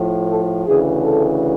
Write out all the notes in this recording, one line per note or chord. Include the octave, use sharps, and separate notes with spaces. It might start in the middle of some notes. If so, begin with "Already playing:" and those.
Already playing: A2 F3
A4
D2 C#3 E3 G#4
A4